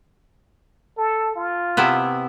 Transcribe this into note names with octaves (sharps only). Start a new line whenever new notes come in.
A4
F4
C3 B3 E4